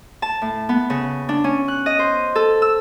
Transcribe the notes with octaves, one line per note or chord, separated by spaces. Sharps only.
A5
A2
B3
C#3
D4
C#4
F#6
D#5
C5
A4
E6